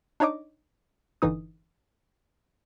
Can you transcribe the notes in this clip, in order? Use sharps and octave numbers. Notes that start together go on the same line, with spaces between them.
D4 D#4 C#5 D#5 D6
G1 D3 E3 D#4 D#6